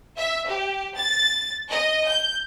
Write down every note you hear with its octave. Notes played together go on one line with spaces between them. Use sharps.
E5
G4
A6
D#5
G6